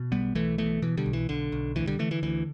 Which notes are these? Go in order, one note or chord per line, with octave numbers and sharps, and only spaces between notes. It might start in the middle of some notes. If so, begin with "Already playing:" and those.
Already playing: B2
B1 G3 B3
B1 E3 A3
B2 E3 A3
B2 E3
D3 G3
B1
E3
B1 D3
B1
D2 E3
D3 G3
D3 E3 A3
E3
D2 E3